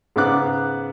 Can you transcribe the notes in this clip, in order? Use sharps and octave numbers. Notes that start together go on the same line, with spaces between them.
G#2 C#3 B3 D6 F#6